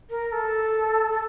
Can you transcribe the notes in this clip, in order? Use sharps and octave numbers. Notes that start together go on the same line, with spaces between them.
A#4
A4
A4